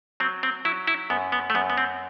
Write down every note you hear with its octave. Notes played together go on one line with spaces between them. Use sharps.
F#3 C4
C4
F#3 E4
E4
F#2 B3
B3
A3
F#2 B3
B3
C4